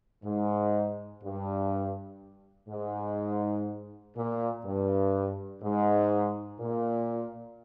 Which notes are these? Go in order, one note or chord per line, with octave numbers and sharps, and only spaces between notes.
G#2
G2
G#2
A#2
G2
G#2
A#2